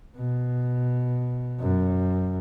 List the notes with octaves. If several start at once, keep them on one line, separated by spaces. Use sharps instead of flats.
B2
F#2